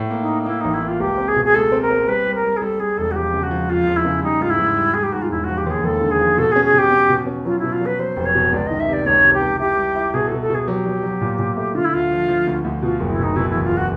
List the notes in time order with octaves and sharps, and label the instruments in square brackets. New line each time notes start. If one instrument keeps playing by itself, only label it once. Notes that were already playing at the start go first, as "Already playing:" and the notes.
Already playing: [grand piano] A2
A#3
[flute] D#4
[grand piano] A#3
[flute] D#4
[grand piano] A#3 [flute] E4
[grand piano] A1 [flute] D#4
[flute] E4
[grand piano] A#3 [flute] F4
[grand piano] C#2 [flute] G4
[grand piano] C4
[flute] G#4
[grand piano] B2
[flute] G#4
[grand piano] G#3 [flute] A4
[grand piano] C4
[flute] A#4
[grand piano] C4
[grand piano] G3 [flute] B4
[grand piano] G3
[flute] A#4
[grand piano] G3
[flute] G#4
[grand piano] G3 [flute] A4
[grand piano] G3 [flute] G#4
[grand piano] E1 [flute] A4
[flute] F#4
[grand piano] F3 [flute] G4
[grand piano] C#3
[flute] F#4
[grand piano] F3
[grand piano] F2 [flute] F4
[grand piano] F3
[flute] E4
[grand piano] C#3
[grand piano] G3 [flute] D#4
[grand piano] G#2 [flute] F4
[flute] E4
[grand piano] G#2
G3
[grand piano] G3 [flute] G#4
[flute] G4
[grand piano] G#2 [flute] F#4
[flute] F4
[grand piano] E1 [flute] E4
[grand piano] F3 [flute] F#4
[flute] G4
[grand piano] D#2 [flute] G#4
[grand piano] D#2 [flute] A4
[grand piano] D3
[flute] G#4
[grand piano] F3
[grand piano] B2 [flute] A4
[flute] G#4
[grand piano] C#4
[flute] G#4
[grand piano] B2 [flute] G4
[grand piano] C#4
B2
C#4
[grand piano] F#3 [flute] F4
[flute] E4
[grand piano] B2
[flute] F4
[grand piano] F#3 [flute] B4
[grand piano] F#3 [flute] C5
[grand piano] F1
[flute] C#5
[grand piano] B2
[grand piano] C#2 [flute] D5
[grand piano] D#3 [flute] D#5
[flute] E5
[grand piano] C3 [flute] D5
[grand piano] C#2 [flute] C#5
[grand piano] C3
[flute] G4
[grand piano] C#2
[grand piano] E4 [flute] G4
[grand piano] G3
E4
[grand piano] B2 [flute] G#4
[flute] A4
[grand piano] B2
[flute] A4
[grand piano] B2 [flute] G#4
[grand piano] F#3 [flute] G4
[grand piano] F#3
F#3
A#2
A#2
A3
[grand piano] D3 [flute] F4
[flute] E4
[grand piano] D2 [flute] F4
[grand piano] F3
F3
D2
D2
[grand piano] B2 [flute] F4
[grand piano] F#1
[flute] E4
[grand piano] B2 [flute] D#4
[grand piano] B2 [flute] E4
[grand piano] E2 [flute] E4
[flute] F4
F#4